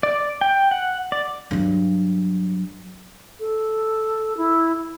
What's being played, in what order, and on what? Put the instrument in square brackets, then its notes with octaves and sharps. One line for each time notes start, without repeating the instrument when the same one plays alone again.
[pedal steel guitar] D5
G5
F#5
D5
[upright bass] G2 F#3
[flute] A4
E4